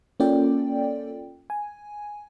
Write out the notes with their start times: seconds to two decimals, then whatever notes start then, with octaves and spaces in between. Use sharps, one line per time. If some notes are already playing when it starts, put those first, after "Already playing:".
0.20 A#3 C#4 F4 A4 D5 G5
1.50 G#5